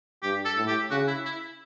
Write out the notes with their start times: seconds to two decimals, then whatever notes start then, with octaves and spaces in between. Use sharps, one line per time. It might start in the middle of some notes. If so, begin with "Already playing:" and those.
0.22 G2 G4
0.45 A4
0.57 A2
0.67 G4
0.91 C#3 F#4
1.07 E4
1.25 E4